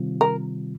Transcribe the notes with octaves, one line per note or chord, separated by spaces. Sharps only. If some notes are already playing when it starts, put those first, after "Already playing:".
Already playing: C3 D#3 G3 C4 F4
A#4